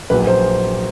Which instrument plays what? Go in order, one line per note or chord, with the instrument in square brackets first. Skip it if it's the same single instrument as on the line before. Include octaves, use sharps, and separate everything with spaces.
[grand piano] A#1 A#2 F#3 A#3 [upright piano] B4
[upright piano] C5